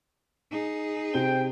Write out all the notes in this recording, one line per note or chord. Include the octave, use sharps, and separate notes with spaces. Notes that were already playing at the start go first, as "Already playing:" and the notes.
D#4 G#4
C3 C5 G5 G7